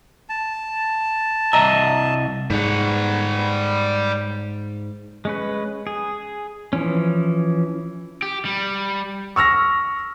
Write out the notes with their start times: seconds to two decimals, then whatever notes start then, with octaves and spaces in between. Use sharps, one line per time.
0.29 A5
1.53 C2 D#5 E5 A#5
2.50 G#2 G3 F#5
5.25 G#3 C#4 B4
5.87 G#4
6.73 E3 F3 C#4
8.22 G4
8.45 G3
9.36 C#6 E6 F6 A#6